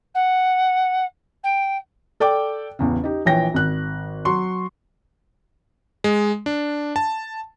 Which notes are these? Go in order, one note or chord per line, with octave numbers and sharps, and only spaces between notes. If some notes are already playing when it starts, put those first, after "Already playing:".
F#5
G5
A4 D5 G5 D6
A1 E2 C#3
D#4 G4
A#1 E3 C#5 G5 A#6
G#1 F#6
F#3 C6 C#6
G#3
D4
A5